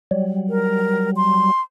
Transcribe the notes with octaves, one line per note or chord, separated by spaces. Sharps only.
F#3 G3
A#4
C6